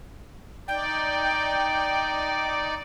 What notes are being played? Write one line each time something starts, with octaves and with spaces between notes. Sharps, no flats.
D#4 D5 G5